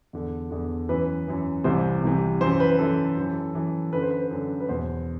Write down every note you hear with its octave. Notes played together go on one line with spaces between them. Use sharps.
E2 D3
E2 D3
F#2 E3 B4
F#2 E3
C2 C3 E3 C5
C2 C3 E3
F#2 E3 C5
B4
F#2 E3 A4
F#2 E3
F#2 E3
F#2 D3 B4
C5
B4
F#2 D3
B4
E2 B2 C5